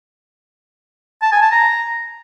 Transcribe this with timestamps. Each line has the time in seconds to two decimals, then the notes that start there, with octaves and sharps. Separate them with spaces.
1.22 A5
1.32 G#5
1.42 A5
1.52 A#5